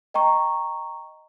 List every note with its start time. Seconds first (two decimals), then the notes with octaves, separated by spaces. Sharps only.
0.14 D#5 G5 A#5 C#6